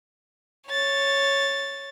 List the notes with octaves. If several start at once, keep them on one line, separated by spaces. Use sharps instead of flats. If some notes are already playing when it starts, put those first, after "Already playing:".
C#5 A6